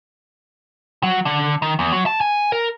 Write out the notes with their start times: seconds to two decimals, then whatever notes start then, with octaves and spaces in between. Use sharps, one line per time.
1.03 F#3
1.25 D3
1.62 D#3
1.79 E2
1.93 F#3
2.06 A5
2.21 G#5
2.52 A#4